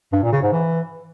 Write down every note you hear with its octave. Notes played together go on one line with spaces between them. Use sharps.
G2
A#2
C#3
G#2
E3